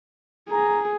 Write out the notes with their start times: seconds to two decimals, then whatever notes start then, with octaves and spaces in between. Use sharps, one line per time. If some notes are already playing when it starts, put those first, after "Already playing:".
0.50 G#4 A#5